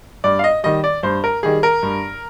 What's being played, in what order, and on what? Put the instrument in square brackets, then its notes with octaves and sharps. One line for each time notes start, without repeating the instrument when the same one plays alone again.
[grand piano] G2 D5
F5
D#5
D#3 G3 D#5
D5
G2 C5
A#4
D#3 G3 G#4
A#4
G2